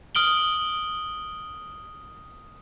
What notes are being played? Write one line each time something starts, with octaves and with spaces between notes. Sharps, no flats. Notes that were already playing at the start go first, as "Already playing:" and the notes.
D#6 F6 D7 F#7 G7